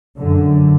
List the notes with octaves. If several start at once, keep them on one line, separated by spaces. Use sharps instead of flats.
F#2 D3